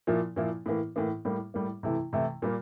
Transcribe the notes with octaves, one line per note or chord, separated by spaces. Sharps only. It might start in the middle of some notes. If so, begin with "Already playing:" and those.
A#2 F3 A#3 E4
A#2 F3 A#3 E4
A2 E3 A#3
A2 E3 A#3
A2 G3 A#3
A2 G3 A#3
C3 E3 A3 E4
C3 E3 A3 E4
A#2 G3 A#3